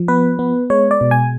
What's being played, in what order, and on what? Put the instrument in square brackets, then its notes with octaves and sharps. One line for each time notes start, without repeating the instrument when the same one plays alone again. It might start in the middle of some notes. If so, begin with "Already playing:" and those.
Already playing: [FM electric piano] F3
B3 B4
B3
G#3 C#5
D5
B2
G#5